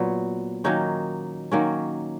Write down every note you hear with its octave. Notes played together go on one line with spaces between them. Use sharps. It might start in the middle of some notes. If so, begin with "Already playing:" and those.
Already playing: A#2 F#3 B3
D#3 F#3 A#3 C#4 D#4
D#3 F#3 A#3 C#4